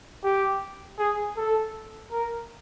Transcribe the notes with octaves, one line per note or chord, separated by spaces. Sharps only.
G4
G#4
A4
A#4